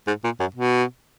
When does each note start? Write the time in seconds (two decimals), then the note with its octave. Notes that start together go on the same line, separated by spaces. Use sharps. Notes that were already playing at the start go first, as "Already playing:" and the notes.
0.07 G#2
0.24 A#2
0.40 F#2
0.55 B2